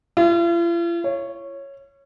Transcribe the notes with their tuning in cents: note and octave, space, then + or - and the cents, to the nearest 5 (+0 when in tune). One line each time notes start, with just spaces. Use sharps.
F4 -45
C#5 -5